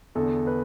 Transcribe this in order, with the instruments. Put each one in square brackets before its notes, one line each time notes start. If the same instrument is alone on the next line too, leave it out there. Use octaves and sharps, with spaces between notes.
[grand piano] E2 D3 A4
B4